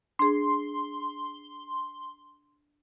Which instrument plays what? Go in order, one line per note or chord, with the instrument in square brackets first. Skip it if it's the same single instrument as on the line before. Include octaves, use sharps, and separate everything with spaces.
[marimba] D4 G#4 [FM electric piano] C6